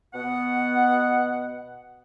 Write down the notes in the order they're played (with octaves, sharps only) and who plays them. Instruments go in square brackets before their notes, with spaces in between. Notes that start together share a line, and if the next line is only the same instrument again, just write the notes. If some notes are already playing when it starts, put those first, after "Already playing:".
[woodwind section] B2 B3 F#5